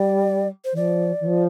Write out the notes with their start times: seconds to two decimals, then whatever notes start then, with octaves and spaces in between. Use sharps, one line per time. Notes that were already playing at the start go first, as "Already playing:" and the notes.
Already playing: G3 D5
0.65 C5
0.72 E3
0.76 F3 D5
1.19 E3
1.25 F3